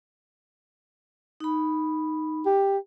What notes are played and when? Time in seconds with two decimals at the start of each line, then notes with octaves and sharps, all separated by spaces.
1.40 D#4 B5
2.46 G4